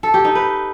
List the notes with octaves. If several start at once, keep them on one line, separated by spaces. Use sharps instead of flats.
A4
G4
D#4
B4